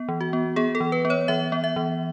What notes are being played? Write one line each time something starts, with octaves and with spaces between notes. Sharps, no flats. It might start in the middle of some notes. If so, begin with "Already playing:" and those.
Already playing: B3
E3
F#4
B3
B3 G#4
A4
E3
B4
B3
C#5
E3 E5
B3
E5
E3